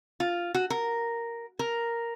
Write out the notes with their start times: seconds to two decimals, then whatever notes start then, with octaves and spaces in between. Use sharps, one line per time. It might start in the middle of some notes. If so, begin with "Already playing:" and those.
0.20 F4
0.54 F#4
0.70 A#4
1.59 A#4